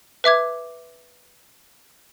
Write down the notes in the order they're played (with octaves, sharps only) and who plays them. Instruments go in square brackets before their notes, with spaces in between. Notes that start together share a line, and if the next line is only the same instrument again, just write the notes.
[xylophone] B4 E5 D6 G#6